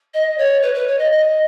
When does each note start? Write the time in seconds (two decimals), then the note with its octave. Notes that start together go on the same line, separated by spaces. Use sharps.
0.14 D#5
0.38 C#5
0.62 B4
0.74 B4
0.88 C#5
0.98 D#5
1.12 D#5